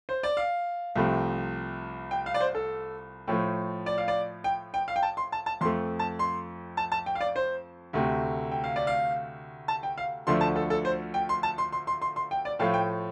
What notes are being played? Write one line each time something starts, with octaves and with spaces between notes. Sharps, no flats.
C5
D5
F5
C2 C3 F3 A3
G5
F5
D5
C5
A4
A2 F3 A3
D5
F5
D5
G5
G5
F5
G5
A5
C6
A5
A5
F2 F3 A3 C6
A5
C6
A5
A5
G5
F5
D5
C5
D2 C3 A3
G5
F5
D5
F5
A5
G5
F5
D2 D3 F3 A3 C6
A5
A4
A4
C5
G5
C6
A5
C6
C6
C6
C6
C6
G5
D5
A2 F3 A3 F5
G5